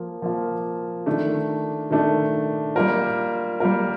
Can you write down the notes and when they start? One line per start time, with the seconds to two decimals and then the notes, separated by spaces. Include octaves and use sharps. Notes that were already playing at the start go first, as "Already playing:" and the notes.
Already playing: F3 A#3 F4
0.22 F3 A#3 F4
1.06 D#3 A3 D4
1.91 D#3 A3 D4
2.76 G3 A#3 F4 A#4
3.60 G3 A#3 F4 A#4